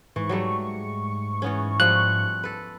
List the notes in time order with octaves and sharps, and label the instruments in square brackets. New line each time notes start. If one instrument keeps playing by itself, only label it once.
[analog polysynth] G#2 C#6 [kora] E3
[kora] F#3 G3 A3
E3 B3 C#4
[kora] F3 G3 E4 [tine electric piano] F#6
[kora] A4 B4